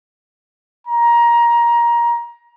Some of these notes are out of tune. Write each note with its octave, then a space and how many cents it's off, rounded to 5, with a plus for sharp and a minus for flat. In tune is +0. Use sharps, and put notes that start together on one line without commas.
A#5 +20